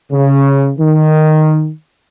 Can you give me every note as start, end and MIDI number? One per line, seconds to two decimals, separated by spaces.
0.12 0.71 49
0.79 1.70 51